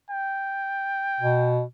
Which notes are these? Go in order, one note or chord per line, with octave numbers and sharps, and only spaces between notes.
G5
B2